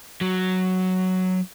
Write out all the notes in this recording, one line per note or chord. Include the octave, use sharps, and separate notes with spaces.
F#3